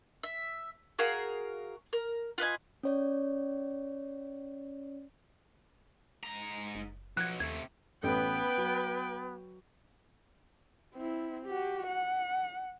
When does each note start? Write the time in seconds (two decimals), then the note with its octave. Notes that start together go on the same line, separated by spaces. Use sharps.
0.23 E5
0.99 F#4 G#4 A#4 F5
1.93 A#4
2.38 F4 B4 D#5 G#5
2.83 C#4 C#5 D5
6.23 G#2 A#5
6.75 F#1
7.17 B2 F3 F#3 F#6 G#6
7.40 D#2 C3 A3 G#6
8.03 A1 B3 B4 G5
8.58 F#3
10.94 C4 E4
11.46 F#4 G4
11.87 F#5